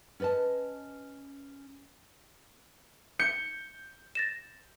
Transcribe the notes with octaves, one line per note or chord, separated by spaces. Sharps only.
C#4 B4 D5 D#5 A5
G6 C#7
A6 A#6 E7